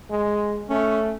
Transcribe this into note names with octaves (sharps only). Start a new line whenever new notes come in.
G#3
A3 C#4